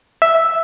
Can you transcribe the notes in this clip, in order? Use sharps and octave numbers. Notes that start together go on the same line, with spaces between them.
E5